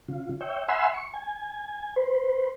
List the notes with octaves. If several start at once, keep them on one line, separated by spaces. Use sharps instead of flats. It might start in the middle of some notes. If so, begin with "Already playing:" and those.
C#3 F4
C#5 E5 G5
E5 F#5 G#5 B5 C6 E6
C#6
G#5
B4 C5